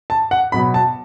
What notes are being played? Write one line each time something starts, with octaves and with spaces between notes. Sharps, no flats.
A5
F#5
B2 F#3 B3 B5
A5